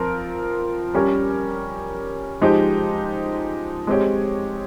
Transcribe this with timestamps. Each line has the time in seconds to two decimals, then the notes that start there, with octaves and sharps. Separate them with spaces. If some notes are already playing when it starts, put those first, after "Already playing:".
Already playing: F3 C4 F4 A#4
0.94 G3 C#4 G4 A#4
2.41 F3 G#3 D#4 G4 C5
3.87 G#3 C4 G4 C#5